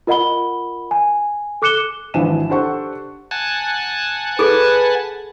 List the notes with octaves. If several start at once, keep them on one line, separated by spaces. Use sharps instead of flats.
F4 A#4 D#5 F#5 B5 G7
G#5
A4 D6 F#6 C#7 E7 G7
G#1 E3 F3 D4 G#5 E7
D4 G4 A4 C5 F#5 C#6
F#5 G#5 A5
G#4 A4 B4